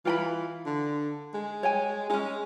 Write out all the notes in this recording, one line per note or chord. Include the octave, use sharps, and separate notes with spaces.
E3 F4 G5 B5
D3
G#3
C#5 G5 G#5
G#3 C#4 D#4